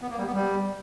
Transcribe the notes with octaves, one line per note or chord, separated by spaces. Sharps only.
B3
A#3
G3
B3
G3